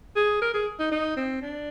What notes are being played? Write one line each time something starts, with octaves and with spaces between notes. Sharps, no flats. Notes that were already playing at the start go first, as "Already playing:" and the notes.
G#4
A#4
G#4
D#4
D#4
C4
D4